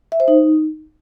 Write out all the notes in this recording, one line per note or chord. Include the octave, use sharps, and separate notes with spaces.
E5
C5
D#4